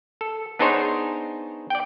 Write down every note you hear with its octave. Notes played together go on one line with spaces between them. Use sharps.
A4
B3 D4 D#4 G#4 C5 C#5
D5 G5